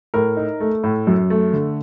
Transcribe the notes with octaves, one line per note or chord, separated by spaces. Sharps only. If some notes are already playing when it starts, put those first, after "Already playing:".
A2 A#4
D#4
A3
A2
F#2
A3
D3